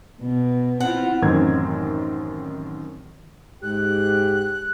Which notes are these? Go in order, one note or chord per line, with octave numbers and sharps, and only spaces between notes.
B2
C4 E4 F4 F#5
A1 F#2 D#3 C4 G#6
G#2 G4 F#6